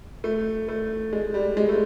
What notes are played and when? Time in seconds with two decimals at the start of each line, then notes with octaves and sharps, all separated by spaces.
0.24 A3
0.69 A3
1.13 G#3
1.34 G3
1.57 G#3
1.69 A3